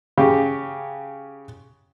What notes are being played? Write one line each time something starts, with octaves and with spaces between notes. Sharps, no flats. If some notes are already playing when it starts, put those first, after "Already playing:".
C#3 G4